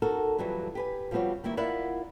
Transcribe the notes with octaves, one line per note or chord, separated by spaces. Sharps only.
D#4 F#4 A4 A#4
F2 E3 F#3 G3
G4 B4 G#5
F3 G3 B3 C4 F#4 C#5
D#3 G3 A#3 E4
E4 F4 A#4 D5 E5 F#5